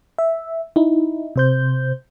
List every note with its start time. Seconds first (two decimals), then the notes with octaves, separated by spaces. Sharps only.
0.19 E5
0.76 D#4 E4
1.36 C3 C5 G6